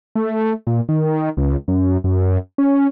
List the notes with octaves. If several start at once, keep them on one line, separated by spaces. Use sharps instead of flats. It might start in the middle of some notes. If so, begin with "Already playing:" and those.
A3
A#2
D#3
C#2
F#2
F#2
C#4